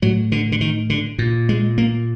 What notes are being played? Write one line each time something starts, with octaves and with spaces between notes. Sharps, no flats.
A2 F#3
D3
D3
D#3
D3
A#2
G#3
A#3